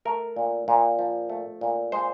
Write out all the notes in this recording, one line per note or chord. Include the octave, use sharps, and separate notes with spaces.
A3 A#4
A#2
A#2
F3
A3
A#2
G#3 C5